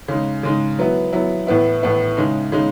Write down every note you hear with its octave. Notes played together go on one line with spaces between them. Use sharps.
C#3 G#3 D#4
C#3 G#3 D#4
F#3 B3 E4
F#3 B3 E4
A2 E3 B3 E4
A2 E3 B3 E4
C#3 G#3 D#4
C#3 G#3 D#4